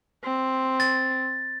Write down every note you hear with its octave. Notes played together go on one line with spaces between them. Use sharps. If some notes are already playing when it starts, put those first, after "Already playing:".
C4
A6